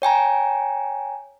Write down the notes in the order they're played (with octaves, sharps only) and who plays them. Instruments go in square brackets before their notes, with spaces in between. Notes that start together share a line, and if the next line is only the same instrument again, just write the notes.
[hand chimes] C#5 G5 G#5 A#5